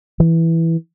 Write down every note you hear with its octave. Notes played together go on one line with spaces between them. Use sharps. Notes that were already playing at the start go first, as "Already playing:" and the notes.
E3